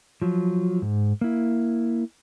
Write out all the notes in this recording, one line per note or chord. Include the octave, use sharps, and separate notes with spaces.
F3 F#3
G#2
A#3 E4